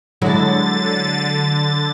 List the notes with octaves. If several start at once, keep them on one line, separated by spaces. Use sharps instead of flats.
D3 F#3 G#3 E4 A6